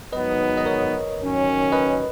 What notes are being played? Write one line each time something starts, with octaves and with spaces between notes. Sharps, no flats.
G#2 D#3 F#3 B3 D#4 B4 D#5
D#5
A#4 C#5
D#3 F#3 C#4
B4 D#5